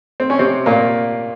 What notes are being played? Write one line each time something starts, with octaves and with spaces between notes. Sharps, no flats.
C4
C#4
C3 C4
A#2 A#3